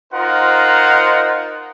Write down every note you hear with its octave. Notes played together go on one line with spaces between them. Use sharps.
D#4 F4 A#4 C5 F#5